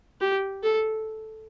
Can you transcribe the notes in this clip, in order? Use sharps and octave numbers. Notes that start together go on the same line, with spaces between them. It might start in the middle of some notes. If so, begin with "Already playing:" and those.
G4
A4